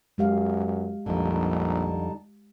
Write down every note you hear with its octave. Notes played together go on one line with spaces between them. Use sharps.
F#2 G#3 G4 F5
A#1 F2 D3 G3 D#4 A5